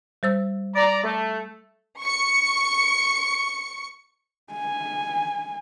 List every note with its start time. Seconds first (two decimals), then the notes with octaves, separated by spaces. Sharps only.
0.23 G3 C5 E6
0.75 D5 A#5
1.04 A3
2.00 C#6 C#7
4.53 G#5